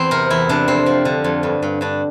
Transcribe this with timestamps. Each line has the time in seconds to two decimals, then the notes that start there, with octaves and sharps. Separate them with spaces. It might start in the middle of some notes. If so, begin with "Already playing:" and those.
Already playing: E2 C4
0.11 C3 A#4
0.30 E2 E4
0.49 C3 D4
0.68 F2 C4
0.86 F3
1.05 D3
1.24 F2
1.43 G2
1.62 G2
1.81 G2 D4